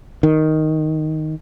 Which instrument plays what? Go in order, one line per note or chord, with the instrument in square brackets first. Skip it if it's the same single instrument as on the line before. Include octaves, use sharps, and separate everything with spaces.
[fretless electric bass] D#3